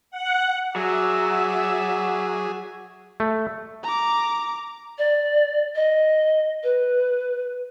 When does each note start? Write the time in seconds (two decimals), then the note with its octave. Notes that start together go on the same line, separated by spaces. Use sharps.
0.11 F#5
0.76 F#3 G#4 D5 E5
3.20 A3
3.83 A#5 D6
4.98 D5
5.75 D#5
6.63 B4